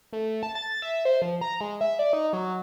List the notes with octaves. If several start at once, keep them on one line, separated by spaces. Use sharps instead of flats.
A3
A5
A6
E5
C5
F3
A#5
G#3
E5
D5
D#4
F#3